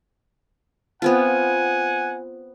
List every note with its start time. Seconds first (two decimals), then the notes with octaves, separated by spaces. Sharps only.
1.02 B3 C4 F4 F#5 G#5